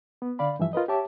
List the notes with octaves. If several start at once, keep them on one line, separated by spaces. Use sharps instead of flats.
B3
D3 D5 F5 B5
G2 E3 F3 E5
F4 A#4 B4 D#5
G4 C#5 E5 A5 D6